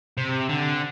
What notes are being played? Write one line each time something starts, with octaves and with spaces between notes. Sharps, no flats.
C3
D3